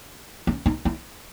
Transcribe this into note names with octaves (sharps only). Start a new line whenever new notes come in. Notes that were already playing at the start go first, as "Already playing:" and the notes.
C#4
D#4
E4